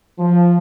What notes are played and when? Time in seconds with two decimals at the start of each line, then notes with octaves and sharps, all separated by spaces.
0.18 F3